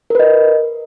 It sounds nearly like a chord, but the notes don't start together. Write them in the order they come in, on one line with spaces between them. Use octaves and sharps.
A#4 B4 D#5